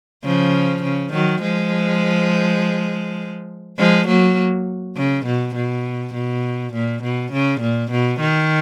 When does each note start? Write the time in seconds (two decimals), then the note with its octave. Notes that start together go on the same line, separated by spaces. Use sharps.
0.24 C#3 F3
0.83 C#3
1.12 D#3 F#3
1.42 F3 G#3
3.78 F3 G#3
4.08 F#3 A#3
4.97 C#3
5.26 B2
5.55 B2
6.14 B2
6.73 A#2
7.03 B2
7.33 C#3
7.61 A#2
7.91 B2
8.21 D#3